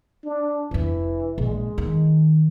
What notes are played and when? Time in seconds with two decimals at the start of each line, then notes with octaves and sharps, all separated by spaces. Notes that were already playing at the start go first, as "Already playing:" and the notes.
0.25 D4
0.71 F1 E3 D4
1.38 A#1 G#3
1.78 D#3